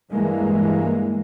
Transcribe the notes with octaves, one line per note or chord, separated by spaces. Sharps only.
G2 E3 G#3 A#3